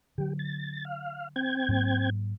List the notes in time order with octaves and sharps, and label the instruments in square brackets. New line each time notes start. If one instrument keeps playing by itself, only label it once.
[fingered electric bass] D3 F#3 [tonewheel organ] G4
[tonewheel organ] A6
F5
C4 G5 G#6
[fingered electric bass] G#2 F#3 A#3